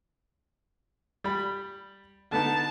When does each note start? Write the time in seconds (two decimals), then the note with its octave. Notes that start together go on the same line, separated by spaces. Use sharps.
1.24 G3 B5
2.32 D3 B3 D#4 A5